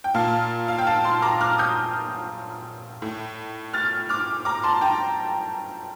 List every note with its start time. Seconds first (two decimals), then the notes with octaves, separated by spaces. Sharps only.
0.04 G5
0.15 A#2 F5 A5
0.68 F5
0.78 G5
0.86 F5 A5
1.04 A5 C6
1.22 A#5 D6
1.40 D6 F6
1.58 D#6 G6
3.02 A2
3.73 F6 A6
4.09 D6 F6
4.45 A#5 D6
4.63 A5 C6
4.81 G5 A#5